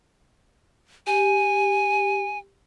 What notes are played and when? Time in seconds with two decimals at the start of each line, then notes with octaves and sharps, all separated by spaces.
1.07 G4 G#5